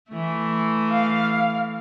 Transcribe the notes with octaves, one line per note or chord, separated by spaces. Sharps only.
E3 A3
F5